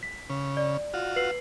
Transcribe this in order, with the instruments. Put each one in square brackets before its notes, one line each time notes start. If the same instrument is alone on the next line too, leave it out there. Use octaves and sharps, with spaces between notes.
[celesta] B6
[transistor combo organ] C#3
[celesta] D5
[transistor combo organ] F4 F#4
[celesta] B4 C7 F#7